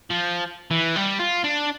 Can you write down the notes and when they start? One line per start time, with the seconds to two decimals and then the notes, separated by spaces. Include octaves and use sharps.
0.10 F3
0.71 E3
0.96 G3
1.19 F4
1.44 D4